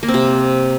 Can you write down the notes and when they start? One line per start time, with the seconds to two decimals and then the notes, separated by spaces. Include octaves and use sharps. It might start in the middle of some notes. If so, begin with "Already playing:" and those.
0.03 A#3
0.08 C4
0.14 C3